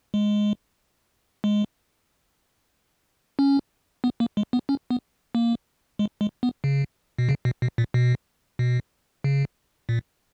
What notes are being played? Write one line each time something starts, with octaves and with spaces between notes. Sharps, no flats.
G#3
G#3
C#4
B3
A#3
G#3
B3
C#4
B3
A#3
G#3
G#3
B3
C#3
B2
C#3
B2
B2
A#2
B2
B2
C#3
A#2